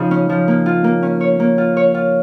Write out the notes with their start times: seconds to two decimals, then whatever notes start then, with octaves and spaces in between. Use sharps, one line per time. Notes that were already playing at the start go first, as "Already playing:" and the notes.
Already playing: C#3 F3 D#4 G#4 D#5
0.11 C#4
0.29 F3
0.48 A#3
0.66 F4
0.84 A#3
1.03 C#4
1.20 C#5
1.40 A#3
1.58 F4
1.77 C#5
1.94 F4